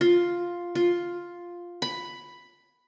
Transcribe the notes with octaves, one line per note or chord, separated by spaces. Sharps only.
F4
F4
B5